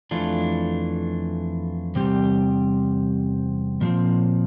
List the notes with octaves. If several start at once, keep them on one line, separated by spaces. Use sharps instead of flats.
F2 E3 A3 D4 F4
E2 C3 G3 C4 G4
A#2 F3 C4